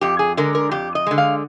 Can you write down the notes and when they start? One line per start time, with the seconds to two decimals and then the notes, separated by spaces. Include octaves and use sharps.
0.01 F2 G4
0.19 G#4
0.37 D3 G#3 A#4
0.55 A#4
0.71 F2 G4
0.95 D#5
1.07 D3 G#3
1.18 F5